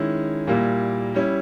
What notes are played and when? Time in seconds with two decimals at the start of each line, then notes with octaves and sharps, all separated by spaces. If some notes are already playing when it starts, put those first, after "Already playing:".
Already playing: D#3 G#3 C#4 E4
0.47 A#2 G3 A#3 E4
1.14 G3 C#4 E4